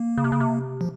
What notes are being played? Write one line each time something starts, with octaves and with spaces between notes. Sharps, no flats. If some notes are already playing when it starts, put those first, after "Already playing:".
Already playing: A#3
C#3
C3
C#3
C3
F3